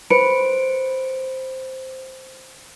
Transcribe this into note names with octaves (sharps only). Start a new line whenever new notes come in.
B4 C5 C#7 D7